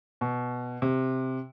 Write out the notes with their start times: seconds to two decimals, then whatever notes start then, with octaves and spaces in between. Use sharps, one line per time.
0.21 B2
0.82 C3